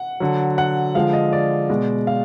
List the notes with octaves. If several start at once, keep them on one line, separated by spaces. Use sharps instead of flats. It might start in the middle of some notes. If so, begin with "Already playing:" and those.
Already playing: F#5
D3 F#3
F#5
D3 F3 G#3 F5
D#5
D5
B2 G#3
F5